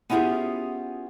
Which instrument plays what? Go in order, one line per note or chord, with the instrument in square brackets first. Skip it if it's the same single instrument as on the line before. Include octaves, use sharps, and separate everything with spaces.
[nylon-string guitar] B3 C#4 E4 F4 G4 G#4